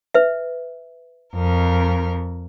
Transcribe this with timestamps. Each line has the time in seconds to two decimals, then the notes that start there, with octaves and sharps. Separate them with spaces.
0.14 B4 E5
1.34 F2 A#4